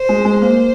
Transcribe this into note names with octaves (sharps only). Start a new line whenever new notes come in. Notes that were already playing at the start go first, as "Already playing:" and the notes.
Already playing: C5
G#3
G#3
A#3 C5